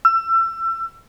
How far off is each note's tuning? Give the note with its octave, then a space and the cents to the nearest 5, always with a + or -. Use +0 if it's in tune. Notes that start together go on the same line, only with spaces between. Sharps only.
E6 +30